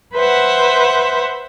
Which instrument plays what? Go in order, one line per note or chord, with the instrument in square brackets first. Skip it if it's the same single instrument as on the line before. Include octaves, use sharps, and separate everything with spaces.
[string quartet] B4 C5 E5 F#5